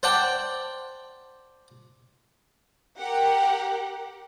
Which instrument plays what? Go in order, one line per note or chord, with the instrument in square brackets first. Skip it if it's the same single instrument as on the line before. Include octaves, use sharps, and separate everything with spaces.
[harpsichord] C5 D5 F#5 G5 A5
[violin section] G4 A#4 F#5